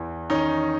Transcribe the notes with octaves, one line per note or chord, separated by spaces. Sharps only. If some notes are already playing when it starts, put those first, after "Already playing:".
Already playing: E2 E3
D#3 C#4 D#4